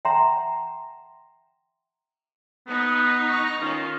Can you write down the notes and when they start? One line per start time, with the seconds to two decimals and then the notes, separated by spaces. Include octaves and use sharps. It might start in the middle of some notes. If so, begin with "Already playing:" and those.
0.05 E5 F#5 G5 A5 A#5 C6
2.68 B3 D#4
3.29 A#5 C#6
3.61 D#3 C#4 D#4 F4